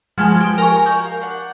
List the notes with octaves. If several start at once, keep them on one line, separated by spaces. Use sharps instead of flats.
F3 G#3 F#4 B4 G#5 A5
G4
A#4 D#5 G#5 C#6 F6
F#4 G6
F5
D4 F#5